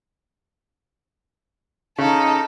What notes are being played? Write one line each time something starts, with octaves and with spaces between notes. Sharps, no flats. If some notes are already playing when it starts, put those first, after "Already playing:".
C#3 D#4 A4